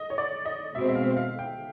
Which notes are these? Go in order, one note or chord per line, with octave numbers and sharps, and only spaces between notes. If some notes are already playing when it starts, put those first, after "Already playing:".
Already playing: D#5
C#5
D5
D#5
B2 G#3 C4 E5
E5
F5
F5
G5